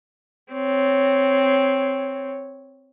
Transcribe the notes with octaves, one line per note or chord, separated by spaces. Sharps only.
C4 C#5